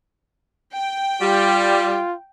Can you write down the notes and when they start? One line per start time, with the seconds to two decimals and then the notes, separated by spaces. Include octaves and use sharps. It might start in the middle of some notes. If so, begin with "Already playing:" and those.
0.75 G5
1.21 G3 F4